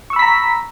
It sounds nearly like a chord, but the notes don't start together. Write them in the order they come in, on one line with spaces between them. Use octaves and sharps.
C#6 E6 B5 B6 A#5